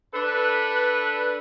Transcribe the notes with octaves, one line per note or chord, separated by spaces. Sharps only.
D4 A4 B4